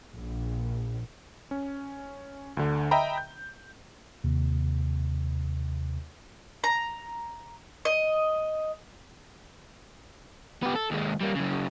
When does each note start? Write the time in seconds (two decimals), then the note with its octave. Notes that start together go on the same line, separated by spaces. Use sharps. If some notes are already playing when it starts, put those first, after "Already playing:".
0.14 A#1
1.51 C#4
2.57 D2 D3
2.91 D#5 E5 G5 A#5 B5
3.18 G6
4.24 D#2 C3
6.64 A#5
7.85 D#5
10.63 B3 G4
10.75 A4
10.91 D#2 G#3
11.21 G3 A#3
11.36 F#2 C#3